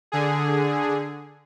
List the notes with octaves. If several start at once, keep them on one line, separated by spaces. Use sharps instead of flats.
D3 G#4